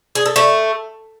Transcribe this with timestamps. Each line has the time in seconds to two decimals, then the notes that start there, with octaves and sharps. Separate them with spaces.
0.15 G#4
0.26 A4
0.36 A3